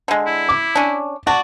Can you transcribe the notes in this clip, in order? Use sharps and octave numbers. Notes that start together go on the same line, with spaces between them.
D3 G#3
E4
D6
C#4 D4
F#4 D5 A5